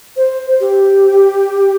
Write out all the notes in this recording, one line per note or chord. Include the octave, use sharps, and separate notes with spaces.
C5
G4